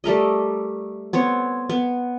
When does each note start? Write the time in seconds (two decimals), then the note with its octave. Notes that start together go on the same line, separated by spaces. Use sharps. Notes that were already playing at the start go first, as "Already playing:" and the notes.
0.04 G3 A3 A#4 D#5
1.13 B3 C4 C#5
1.69 B3